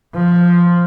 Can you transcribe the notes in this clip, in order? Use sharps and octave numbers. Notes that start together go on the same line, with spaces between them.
F3